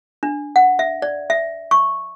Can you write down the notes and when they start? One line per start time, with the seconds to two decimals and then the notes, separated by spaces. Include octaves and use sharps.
0.23 D4
0.56 F#5
0.79 E5
1.02 D5
1.30 E5
1.71 C#6